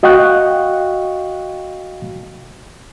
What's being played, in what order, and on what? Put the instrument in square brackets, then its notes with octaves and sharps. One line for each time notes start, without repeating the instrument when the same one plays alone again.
[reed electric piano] F#4 D#5 F5 G5 C#6 F#6